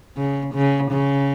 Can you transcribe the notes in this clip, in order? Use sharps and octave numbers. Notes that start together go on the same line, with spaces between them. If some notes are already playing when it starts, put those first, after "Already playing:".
C#3
C#3
C#3